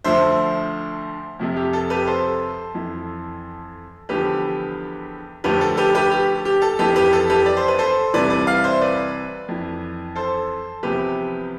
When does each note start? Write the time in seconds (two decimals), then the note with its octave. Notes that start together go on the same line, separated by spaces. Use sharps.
0.04 D2 D3 F3 C5 E5
1.39 F2 C3 F3
1.56 G4
1.73 A4
1.90 G4 B4
2.07 A4 C5
2.74 F2 E3
4.09 E2 D3 F3 G4 B4
5.44 D2 D3 F3 G4 B4
5.61 A4
5.77 G4 B4
5.95 G4 B4
6.11 G4
6.45 G4
6.62 A4
6.79 F2 E3 G4 B4
6.96 G4 B4
7.13 A4
7.30 G4 B4
7.46 D5
7.57 C5
7.68 B4
7.79 A4 C5
8.14 C2 C3 E3 B4 D5
8.30 B4 D5
8.47 D5 F5
8.64 C5 E5
8.81 B4 D5
9.48 F2 E3
10.15 A4 C5
10.83 E2 C3 F3 G4 B4